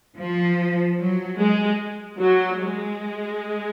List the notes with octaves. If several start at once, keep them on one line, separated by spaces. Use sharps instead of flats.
F3
F#3
G#3
F#3
G#3